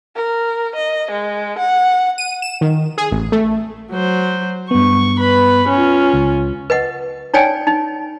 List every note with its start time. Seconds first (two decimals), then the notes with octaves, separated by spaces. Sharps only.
0.16 A#4
0.75 D#5
1.11 G#3
1.59 F#5
2.18 D#7
2.42 E7
2.61 D#3
2.98 G#4
3.11 A1
3.32 A3
3.92 F#3 C5
4.71 G2 B3 C#6
5.18 B4 B5
5.68 C#4 F4
6.14 C#2
6.70 B4 D#5 F#5
7.34 D#4 C#5 D5 G5 G#5
7.67 D#4